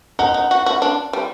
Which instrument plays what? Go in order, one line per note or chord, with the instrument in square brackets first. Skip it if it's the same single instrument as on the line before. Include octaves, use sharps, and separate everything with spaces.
[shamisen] D#4 [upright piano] F#5
[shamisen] D#4
F#4
F#4
D4
G3